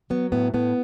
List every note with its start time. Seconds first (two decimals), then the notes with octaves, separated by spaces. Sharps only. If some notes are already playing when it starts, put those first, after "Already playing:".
0.10 F#3 B3
0.32 A2 B3
0.54 A2 B3